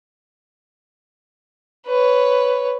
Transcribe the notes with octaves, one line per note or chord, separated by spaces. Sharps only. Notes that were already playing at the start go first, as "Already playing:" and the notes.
B4 C#5